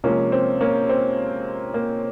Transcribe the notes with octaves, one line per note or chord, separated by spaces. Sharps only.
C3 F3 G#3 A#3 C#4
C4
A#3 C#4
C4
A#3